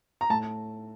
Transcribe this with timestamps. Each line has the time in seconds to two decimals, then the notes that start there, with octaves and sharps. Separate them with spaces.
0.21 A#5
0.30 A2 A5